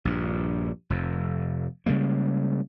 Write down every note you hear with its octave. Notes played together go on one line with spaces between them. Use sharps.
A#1 G2
F1 F2
C#3 G3 G#3 A#3